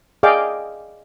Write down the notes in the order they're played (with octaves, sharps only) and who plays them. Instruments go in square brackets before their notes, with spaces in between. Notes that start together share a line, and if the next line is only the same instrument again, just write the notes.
[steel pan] G#4 D5 D#5 F5 G5 D6